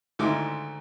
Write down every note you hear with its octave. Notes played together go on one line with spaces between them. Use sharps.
D2 G#2 D#3 E4 D6